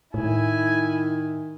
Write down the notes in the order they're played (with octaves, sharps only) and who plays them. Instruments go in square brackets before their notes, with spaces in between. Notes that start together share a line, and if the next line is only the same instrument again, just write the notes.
[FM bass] A2 [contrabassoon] D#3 [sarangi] E4 [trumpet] G#5